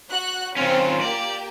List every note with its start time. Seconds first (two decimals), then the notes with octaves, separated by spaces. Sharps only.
0.11 F#4 F#6
0.56 D#3 C4 C#4 F4
1.01 A#3 G4 D5